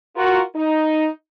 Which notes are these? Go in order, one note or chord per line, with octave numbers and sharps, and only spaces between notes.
F4 F#4 A#4
D#4